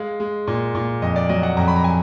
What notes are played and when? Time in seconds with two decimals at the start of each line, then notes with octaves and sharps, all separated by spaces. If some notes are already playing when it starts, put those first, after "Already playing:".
Already playing: G#3 F5
0.20 G#3
0.47 A#2
0.75 A#2
1.02 F2 D#5
1.16 D5
1.29 F#3 D#5
1.43 F#5
1.57 F2 A#5
1.68 B5
1.76 A#5
1.84 G#5